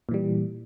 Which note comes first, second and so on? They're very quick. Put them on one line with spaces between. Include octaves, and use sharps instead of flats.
A#2 E3 G3